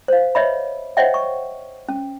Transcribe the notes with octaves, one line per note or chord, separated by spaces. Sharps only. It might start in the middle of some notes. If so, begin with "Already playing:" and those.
C5 F5
B4 C#5 D#5 E5 B5
C5 C#5 D#5 E5 F#5 G5
C#6
C#4